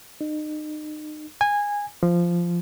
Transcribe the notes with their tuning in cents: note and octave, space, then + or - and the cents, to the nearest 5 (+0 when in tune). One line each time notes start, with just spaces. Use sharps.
D#4 -35
G#5 -15
F3 -10